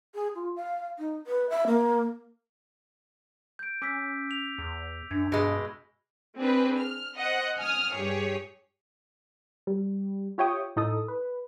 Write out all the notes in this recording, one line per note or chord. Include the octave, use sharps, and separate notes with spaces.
G#4
F4
F5
D#4
B4
E5
A#3
G6 D7
C#4 D6 E6 B6
F7
E2
F#2 D4 G#6
G2 B2 G#3 E6 A#6
C4 D4 G#4 B4
F6
C5 D#5 F#5
G#5 D#6 F6
G2 G4 G#4 C#5
G3
F4 G4 C#5 E5 G5 D#6
A2 D#4 E4 A4 D#6
B4